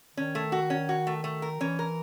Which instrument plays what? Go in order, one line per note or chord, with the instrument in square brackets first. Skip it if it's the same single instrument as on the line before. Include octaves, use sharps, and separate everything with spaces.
[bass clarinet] D#3 [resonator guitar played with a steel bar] C#4
[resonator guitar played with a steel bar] A3
F#4
C#4
F#4
A3
A3
A#4
[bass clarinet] E3 [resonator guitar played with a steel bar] C#4
[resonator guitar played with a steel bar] A#4